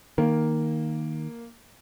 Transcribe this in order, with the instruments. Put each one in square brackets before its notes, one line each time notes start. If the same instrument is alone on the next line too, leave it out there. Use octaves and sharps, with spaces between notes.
[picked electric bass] D#3 [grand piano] A#3